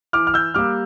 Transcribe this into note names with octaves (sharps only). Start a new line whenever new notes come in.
E3 D6 F6
F6
E6 G6
G3 A#3 D6 F6